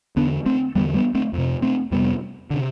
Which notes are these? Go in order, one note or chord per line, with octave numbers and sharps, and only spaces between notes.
E2 D3 B3 D4
A3 C4
E2 D3 G3 B3
G3 B3
A3 C4
F2 C3
A3 C4
F2 C3 G3 B3
D3
C3